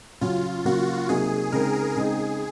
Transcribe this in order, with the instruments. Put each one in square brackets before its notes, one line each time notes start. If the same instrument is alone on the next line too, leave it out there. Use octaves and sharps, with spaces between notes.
[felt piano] C#3 F#3 C#4 [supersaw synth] F4
[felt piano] C#3 F#3 A#3 [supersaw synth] F#4
[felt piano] C3 F#3 A#3 D#4 [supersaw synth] G#4
[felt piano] C#3 G#3 C4 D#4 [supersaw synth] A#4
[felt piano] C#3 G#3 C4 D#4 [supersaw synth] G#4